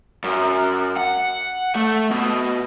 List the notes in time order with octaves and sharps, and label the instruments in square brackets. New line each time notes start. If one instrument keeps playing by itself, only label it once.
[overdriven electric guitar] F#2
F#5
A3
B2